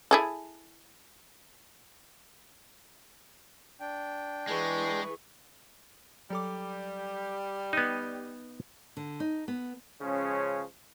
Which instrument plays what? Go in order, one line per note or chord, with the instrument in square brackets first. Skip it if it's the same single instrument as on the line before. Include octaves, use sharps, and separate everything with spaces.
[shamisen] E4 G#4 A4
[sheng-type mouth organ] D4 G5
[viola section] E3 G#4 [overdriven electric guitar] G#3 [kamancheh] B4 C#6
[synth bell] F#3 A4 D6 [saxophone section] G3
[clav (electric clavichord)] B3 D#4 [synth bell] D#7
[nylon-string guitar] D3
D#4
B3
[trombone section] C#3 F3 G#3 C#4